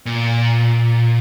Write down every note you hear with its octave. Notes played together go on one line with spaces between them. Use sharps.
A#2